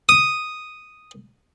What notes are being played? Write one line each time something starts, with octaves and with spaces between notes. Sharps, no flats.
D#6